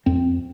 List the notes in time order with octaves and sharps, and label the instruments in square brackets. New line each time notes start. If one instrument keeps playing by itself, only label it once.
[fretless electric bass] F2 C4